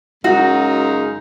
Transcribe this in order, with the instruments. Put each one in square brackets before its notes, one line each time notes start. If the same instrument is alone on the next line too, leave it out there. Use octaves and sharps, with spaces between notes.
[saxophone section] F#2 C#3 G#3 D#4 [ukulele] F#4